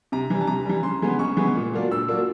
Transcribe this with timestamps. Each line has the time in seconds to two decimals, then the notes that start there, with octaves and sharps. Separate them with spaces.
0.12 C3 A#5
0.30 E3 G3
0.41 A5
0.47 C3 A#5
0.65 E3 G3
0.83 C#3 C6
1.02 E3 G#3 B3
1.19 C#3 C#6
1.37 E3 G#3 B3
1.55 A#2
1.73 F#3 A#3 D4 F4
1.91 A#2 E6
2.08 F#3 A#3 D4 F4